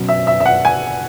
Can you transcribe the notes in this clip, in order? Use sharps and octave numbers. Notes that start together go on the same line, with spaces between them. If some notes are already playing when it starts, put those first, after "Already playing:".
Already playing: B2 F#3 C#4
E5
E5
E5
F#5
G#5